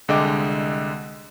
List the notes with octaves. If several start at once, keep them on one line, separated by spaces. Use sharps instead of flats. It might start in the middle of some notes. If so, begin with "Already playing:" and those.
C2 D3 G#3 D#5 G5 D6